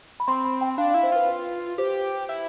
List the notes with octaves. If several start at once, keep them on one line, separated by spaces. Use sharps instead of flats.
B5
C4 C6
B5
G5
D4 F5
E4 F5
C5
F4 B4
B4
G4 C5
E4